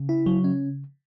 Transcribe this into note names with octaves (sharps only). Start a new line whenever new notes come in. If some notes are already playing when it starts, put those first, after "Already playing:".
Already playing: C#3
E4
F#3
C#4